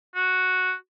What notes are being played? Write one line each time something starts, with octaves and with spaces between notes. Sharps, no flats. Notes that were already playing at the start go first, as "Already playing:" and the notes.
F#4